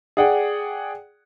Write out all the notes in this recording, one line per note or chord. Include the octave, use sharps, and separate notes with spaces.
G#4 D5 F#5 G5